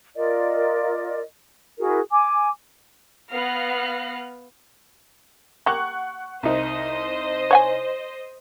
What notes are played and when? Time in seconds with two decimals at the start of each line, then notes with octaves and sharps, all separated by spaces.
0.15 F4 A#4 D5 D#5
1.78 E4 F#4 G#4 A#4
2.11 G#5 D6
3.32 B3 F5 F6 F#6 A#6 C7
5.66 A#3 G4 F#5 C#6 F#6
6.43 C2 D#4 C5 D#5
7.51 C#5 F#5 G#5